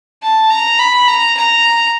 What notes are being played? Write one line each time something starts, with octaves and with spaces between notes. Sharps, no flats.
A5
A#5
B5
A#5
A#5